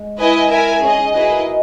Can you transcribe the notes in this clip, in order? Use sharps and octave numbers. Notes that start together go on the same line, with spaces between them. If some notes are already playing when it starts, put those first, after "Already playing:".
Already playing: G#3
E4 B4 D#5 G#5
E4 A#4 E5 G#5
C#4 D#4 G#4 D#5
D#4
E4 F#4 G#4 B4 D#5
A#4
D#5